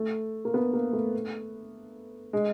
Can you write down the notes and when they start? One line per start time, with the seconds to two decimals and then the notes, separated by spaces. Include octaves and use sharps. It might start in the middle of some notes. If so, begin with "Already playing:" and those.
Already playing: A3
0.45 A#3
0.54 B3
0.73 A#3
0.93 A3
2.33 G#3